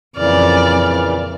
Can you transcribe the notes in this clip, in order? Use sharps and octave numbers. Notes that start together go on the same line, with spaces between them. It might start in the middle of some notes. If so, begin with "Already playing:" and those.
F2 A#2 C#3 E3 D5 F6